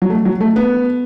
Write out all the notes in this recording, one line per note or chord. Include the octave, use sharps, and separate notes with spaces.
F#3
A3
F#3
A3
B3